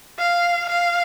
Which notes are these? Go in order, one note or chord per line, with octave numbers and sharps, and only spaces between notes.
F5
F5